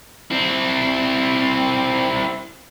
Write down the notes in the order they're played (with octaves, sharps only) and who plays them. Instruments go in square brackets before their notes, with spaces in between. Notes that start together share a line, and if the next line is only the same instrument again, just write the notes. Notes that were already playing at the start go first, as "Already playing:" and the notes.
[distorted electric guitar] C4 E4